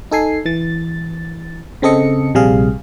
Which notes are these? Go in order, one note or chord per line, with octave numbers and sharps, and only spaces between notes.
D#4 A4 G#5 C7
E3 A6
C#3 C4 A4 D#5 C#7
A#1 C3 G3 G#4 F5